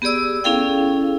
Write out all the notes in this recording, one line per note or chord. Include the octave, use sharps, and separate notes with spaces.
B3 G4 G#4 D5 E6
C#4 E4 G#4 A4 F5 G5